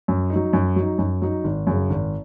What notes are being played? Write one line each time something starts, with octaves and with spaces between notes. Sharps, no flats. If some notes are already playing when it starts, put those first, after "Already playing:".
F#2
D#4
F#3
F#2
F#3 D#4
F#2
F#3 D#4
G#1
F#2 C#3
G#1